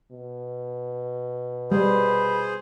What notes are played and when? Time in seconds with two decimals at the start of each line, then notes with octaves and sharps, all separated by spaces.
0.11 B2
1.72 G3 G#4 B4 C5